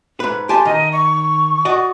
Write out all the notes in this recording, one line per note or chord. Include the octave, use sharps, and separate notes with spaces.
G#2 B4
G4 G#5 A5 C6
D#3 D#5
C#6
F#4 D5 D#5